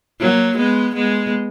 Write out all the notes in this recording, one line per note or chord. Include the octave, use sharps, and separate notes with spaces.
F#3 A#3
G#3 B3
G#3 B3